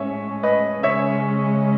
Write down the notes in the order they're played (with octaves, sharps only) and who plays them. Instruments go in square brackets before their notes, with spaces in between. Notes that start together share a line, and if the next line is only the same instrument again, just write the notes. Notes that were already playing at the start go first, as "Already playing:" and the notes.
Already playing: [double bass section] A2 G#3 C#4 [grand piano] C#5 E5
[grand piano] B4 D#5
[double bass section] C#3 G#3 C#4 [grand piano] C#5 E5